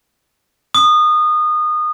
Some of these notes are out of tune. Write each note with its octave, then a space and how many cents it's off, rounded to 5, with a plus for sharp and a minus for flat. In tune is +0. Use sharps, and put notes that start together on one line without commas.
D#6 -25